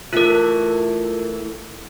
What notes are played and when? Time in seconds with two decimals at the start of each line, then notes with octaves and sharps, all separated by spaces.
0.13 E3 A3 F4 A#4